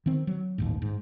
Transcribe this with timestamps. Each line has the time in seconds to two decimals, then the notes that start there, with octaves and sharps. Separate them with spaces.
0.06 D#3 C4
0.27 F#3
0.58 A1 D#2 G#2
0.82 G#2